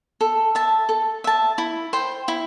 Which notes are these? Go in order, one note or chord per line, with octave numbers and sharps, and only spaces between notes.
A4
E5 A5
A4
E5 A5
E4
C5 G5
E4